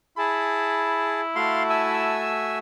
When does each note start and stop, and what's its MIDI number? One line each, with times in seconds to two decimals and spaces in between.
0.18 2.32 64
0.18 1.21 68
0.18 1.21 81
0.18 1.10 83
1.36 2.58 57
1.36 2.58 66
1.36 1.63 77
1.36 2.35 81
1.36 1.63 84
1.70 2.59 76
1.70 2.59 80
1.70 2.59 88